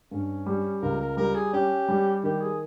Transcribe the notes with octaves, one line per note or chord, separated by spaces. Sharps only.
G2 C#4
G3
C#2 A#4
A#4
G3 A#4
G#4
C#4 G4
G3
D#3 G4
G#4